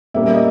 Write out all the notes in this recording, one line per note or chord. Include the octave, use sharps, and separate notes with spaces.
A#2 G3 A#3 C#4 E5
D#5